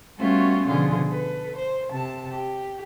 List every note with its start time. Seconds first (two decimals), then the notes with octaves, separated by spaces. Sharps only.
0.18 G3 A3 B3 C#4 F4 F#4
0.66 B2 D3 F3 F4 G#4
1.08 A4 B4
1.55 C5
1.91 C3 A5
2.30 G4